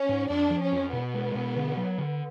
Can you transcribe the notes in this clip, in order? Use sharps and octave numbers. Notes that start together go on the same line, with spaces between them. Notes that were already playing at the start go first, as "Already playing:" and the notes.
Already playing: C#4
G#2
F2 D4
F3
C#4
F2
B2 B3
G#3
B2
D3
F#3
D3